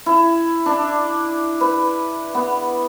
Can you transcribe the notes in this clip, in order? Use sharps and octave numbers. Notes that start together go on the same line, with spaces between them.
E4
D4
B4
B3